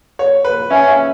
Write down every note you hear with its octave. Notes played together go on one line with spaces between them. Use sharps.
C#5
B4
C#4 E5
E5